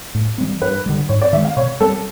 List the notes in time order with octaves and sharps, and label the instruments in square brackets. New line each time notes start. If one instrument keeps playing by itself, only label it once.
[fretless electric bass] A2
E3 G3 C4
[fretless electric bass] G2 [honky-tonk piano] B4
[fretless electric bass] D3 G3
[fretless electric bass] G#2 [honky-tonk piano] C#5
[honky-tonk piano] D5
[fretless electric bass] D#3 [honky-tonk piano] E5
[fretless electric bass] G#3
[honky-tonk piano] F5
[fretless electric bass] B2 [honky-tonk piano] C#5
[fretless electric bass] G3 C4 [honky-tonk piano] A4